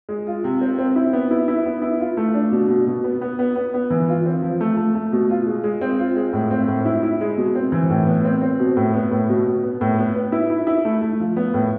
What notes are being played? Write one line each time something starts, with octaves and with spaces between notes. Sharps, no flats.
G#3
F4
C3
C4
C4
E4
B3
E4
E4
B3
E4
F4
A3
D4
B2
B2
B2
B3
B3
B3
B3
B3
E3
F4
C4
F3
A3
A3
A3
B2
F4
G#3
G#3
C4
F4
G#3
A2
C4
A2
E4
E4
G#3
B2
C4
E3
A2
B3
C4
C4
B2
A2
B3
A2
B2
B2
B3
A2
B3
B3
E4
E4
E4
A3
A3
F3
B3
A2